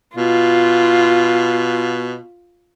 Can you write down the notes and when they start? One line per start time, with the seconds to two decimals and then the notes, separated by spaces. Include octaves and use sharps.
0.16 B2 F4